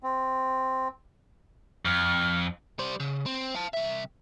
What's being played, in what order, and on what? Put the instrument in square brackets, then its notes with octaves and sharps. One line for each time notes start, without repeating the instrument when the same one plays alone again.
[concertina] C4
[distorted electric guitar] F2 [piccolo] F6
[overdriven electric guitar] G3 C5
C#3
C4
F5 A5
C2 E5